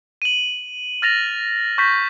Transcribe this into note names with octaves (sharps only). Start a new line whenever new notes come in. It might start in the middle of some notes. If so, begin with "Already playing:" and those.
D#7 F#7
F6 A6 A#6 F7
C#6 G6 A#6 B6